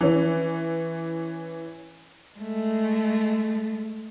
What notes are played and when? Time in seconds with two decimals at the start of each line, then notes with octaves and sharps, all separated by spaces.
0.01 E3 C#4
2.38 G#3 A3